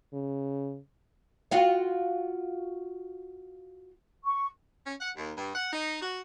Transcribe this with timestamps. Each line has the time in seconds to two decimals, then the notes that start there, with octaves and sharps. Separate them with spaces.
0.13 C#3
1.51 F4 F#4 F5
4.25 C#6
4.87 C#4
5.00 F#5
5.17 D#2
5.37 G2
5.55 F#5
5.73 D#4
6.02 F#4